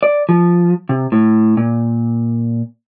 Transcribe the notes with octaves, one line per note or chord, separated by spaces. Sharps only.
D5
F3
C3
A2
A#2